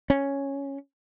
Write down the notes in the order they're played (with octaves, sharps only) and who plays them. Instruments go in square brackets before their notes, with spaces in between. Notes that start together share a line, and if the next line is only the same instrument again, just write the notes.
[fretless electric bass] C#4